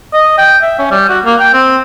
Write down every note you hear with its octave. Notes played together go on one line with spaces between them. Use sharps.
D#5
G5
E5
C#4
G3
F#4
A#3
G5
C4